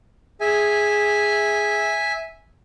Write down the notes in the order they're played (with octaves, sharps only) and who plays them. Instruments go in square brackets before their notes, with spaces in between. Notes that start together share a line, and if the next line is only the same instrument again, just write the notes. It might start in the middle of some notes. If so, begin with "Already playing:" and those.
[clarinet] G#4 [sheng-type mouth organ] E5 G#5